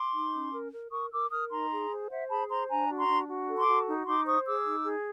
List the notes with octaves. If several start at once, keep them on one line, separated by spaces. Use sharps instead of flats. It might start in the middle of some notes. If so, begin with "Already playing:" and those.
Already playing: C6 D6
D#4
C#4
A#4
A#4
A#4 C#6 D#6
A#4 D6 E6
A#4 D#6 F6
D#4 A#5 C6
G#4
C5
C5 E5 F#5
G#4 A5 B5
C5 A#5 C6
D4 G#5 A#5
F#4
A#5 C6
D4
F#4
A4
C6 D6
F#4
D#4
D#4 C6 D6
C5 C#6 D#6
G#4 D6 E6
D#4
G#4